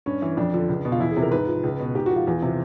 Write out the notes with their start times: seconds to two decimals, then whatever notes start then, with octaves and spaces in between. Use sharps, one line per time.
0.06 G2 C#4
0.22 E3
0.37 F2 D4
0.54 D3 F3
0.69 C#2
0.85 B2
0.92 F4
1.00 E2 E4
1.11 G#4
1.17 C3 F3
1.22 A#4
1.32 G#2 B4
1.47 F3
1.63 C#2
1.80 B2
1.95 G#2 G4
2.06 F3 F#4
2.16 F4
2.27 E2
2.42 C3 F3